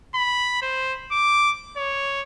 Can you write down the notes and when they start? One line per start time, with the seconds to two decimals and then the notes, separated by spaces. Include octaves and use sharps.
0.15 B5
0.62 C5
1.12 D6
1.77 C#5